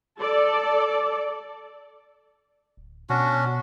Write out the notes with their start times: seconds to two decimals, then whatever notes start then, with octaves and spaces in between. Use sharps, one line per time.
0.19 A4 D5
2.77 D1
3.09 B2 C#4 D4 F#4